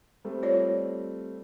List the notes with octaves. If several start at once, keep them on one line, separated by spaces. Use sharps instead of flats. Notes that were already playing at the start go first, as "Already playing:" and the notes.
G3 A3 C4
F4 C#5 D5